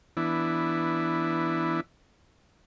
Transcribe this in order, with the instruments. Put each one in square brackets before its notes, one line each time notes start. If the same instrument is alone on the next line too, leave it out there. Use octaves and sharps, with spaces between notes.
[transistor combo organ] E3 B3 D4 E4